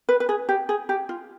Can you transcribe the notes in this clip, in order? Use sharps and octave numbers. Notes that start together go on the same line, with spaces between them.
B4
B4
G#4
G4
G#4
G4
F4